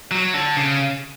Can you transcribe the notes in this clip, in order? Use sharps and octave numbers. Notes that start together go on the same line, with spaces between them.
F#3
D3
C#3